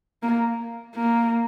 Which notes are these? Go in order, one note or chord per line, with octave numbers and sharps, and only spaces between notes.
A#3
A#3